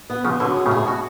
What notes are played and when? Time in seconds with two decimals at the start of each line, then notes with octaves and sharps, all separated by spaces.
0.10 B3
0.24 C#3 F3 B3
0.40 B2 D3 F#3
0.56 G#4
0.66 A2 C#3
0.71 G#4
0.77 A2
0.86 B2 F#4